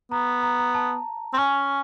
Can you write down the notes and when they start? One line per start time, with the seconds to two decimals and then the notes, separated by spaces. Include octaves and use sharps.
0.11 B3 A#5
0.43 A#5
0.59 A#5
0.74 A5
1.34 C4
1.38 C#4 G#5